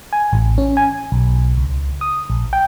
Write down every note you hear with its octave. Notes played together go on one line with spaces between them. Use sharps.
G#5
A1
C#4
G#5
B1
C#2
D#6
A#1
G5